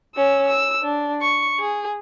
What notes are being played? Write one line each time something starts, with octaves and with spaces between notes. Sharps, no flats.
C#4 E6
E6
D4
C#6
G#4